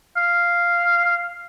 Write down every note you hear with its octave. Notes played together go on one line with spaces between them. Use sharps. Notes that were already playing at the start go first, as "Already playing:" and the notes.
F5